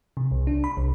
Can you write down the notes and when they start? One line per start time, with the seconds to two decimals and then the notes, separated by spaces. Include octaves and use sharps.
0.17 C3
0.31 C2
0.47 D4
0.64 B5
0.77 C2